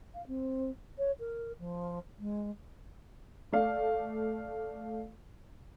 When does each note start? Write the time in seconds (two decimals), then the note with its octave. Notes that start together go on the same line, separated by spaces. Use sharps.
0.14 F5
0.27 C4
0.98 C#5
1.19 A#4
1.59 F3
2.18 G#3
3.52 A3 D5 F5